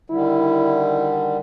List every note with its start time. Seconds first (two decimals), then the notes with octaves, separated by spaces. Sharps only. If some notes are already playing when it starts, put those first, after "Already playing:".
0.10 D3 D#3 G3 E4